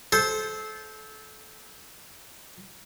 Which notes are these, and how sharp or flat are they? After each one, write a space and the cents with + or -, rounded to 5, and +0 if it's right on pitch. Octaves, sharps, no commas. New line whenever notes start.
A4 -25 C5 +0